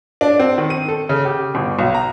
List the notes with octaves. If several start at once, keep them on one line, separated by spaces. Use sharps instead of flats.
D4
C4
D#3
D#7
A4
C#3
G4
G1
B1
A#5